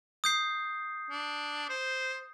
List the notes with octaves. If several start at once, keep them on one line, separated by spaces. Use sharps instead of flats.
D#6 G6 C7
D4
C5